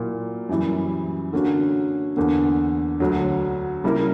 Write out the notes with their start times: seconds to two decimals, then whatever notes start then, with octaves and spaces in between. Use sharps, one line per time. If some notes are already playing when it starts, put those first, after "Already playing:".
Already playing: A#2 F#3 A#3 E4
0.49 F#2 E3 G3
1.33 D3 A#3 C#4 F#4
2.17 E2 D3 A#3
3.00 D2 D3 F#3
3.84 C#3 G3 A#3 E4 A#4